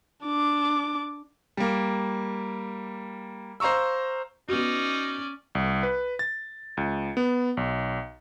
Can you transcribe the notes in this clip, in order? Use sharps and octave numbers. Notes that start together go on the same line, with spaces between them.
D4 D6
G3 A#3
C5 F5 A#5 C#6 E6
B3 C#4 D#4 F#4 D5
C2
B4
A6
C#2
B3
B1